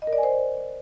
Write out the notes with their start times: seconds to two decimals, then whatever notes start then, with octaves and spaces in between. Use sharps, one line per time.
0.02 D#5
0.07 A#4
0.13 D5
0.18 G#5
0.23 C5